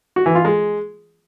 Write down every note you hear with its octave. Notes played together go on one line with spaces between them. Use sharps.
F#4
E3
F4
G#3